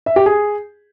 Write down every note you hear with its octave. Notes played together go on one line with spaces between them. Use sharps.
E5
G4
G#4